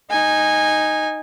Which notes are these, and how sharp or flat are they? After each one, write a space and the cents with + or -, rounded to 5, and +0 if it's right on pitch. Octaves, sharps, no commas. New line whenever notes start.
D#4 +0 G#5 -15